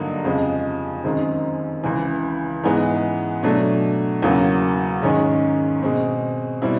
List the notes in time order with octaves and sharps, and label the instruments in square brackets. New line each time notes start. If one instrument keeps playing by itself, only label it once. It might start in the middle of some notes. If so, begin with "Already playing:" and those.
Already playing: [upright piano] G2 D3 F#3 A#3 D#4
F2 C#3 F3 G#3
F#2 D#3 G#3 C4
C#2 C#3 E3
G#2 E3 G#3 B3
B2 F#3 A3 D4
E2 C#3 F#3 A#3
G#2 D#3 G#3 C#4
B2 G#3 C4
B2 G3 C4 E4